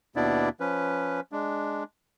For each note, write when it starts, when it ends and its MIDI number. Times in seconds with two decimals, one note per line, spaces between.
0.16 0.49 39
0.16 0.49 47
0.16 0.49 59
0.16 0.49 62
0.16 0.49 64
0.16 0.49 74
0.60 1.20 53
0.60 1.20 61
0.60 1.20 71
1.32 1.84 56
1.32 1.84 62